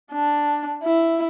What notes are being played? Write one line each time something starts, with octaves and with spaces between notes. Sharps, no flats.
D4
E4